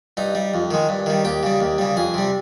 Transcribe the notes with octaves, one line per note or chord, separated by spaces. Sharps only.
G2 D#4
G3
F2
D#3 G#3
G2
D#3 G3
D#2 G4
C#3 G3
D#2
C#3 G3
F2 G#4
C3 G3